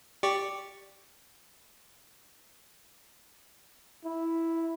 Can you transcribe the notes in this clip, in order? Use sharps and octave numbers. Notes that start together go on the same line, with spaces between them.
G4 D5 C#6
E4